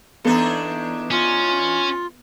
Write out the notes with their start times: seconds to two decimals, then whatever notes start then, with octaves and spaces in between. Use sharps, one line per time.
0.24 E2 B3 D4 D#4 A4
1.11 C#4 F4